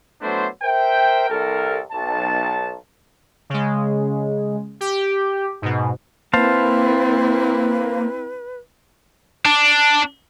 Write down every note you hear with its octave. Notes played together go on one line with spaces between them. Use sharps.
F#3 A3 B3 D4 E4 C5
A#4 C5 E5 G5
C2 A4 A#4
B1 A5
C#3 G#3
G4
G#2 B2
A#3 C4 E4 B4 C5 F5 A5
D4